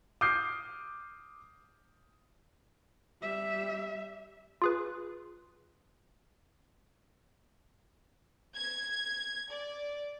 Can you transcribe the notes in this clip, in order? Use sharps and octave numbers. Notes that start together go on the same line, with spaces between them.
D6 D#6 F6 G6 C7
G3 E5
F4 G#4 B4
G#6
D5